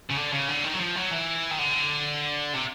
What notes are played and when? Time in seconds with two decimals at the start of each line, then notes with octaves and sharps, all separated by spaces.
0.10 C#3
0.16 D3
0.32 C#3
0.48 D3
0.64 D#3
0.74 F#3
0.80 F3
0.96 F#3
1.11 E3
1.51 D#3
1.59 D3
2.54 C3